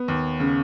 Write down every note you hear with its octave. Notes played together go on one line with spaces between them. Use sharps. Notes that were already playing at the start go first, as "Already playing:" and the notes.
Already playing: B3
D#2
C#3